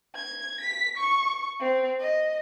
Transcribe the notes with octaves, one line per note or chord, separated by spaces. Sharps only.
G#6
B6
C#6
C4
D#5